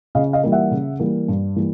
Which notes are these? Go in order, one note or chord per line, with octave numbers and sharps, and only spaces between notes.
C#3 D#5 F5
D#5 F5
E3 G3 A#3
E5 F#5
C#3
E3 G3 A#3
G2
E3 G3 A#3